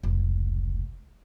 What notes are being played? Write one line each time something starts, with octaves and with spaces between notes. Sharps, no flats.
F1 C#2